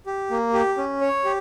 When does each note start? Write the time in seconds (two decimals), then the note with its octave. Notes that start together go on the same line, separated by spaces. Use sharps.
0.06 G4
0.31 A#3
0.54 G4
0.78 C#4
1.01 C#5
1.25 G4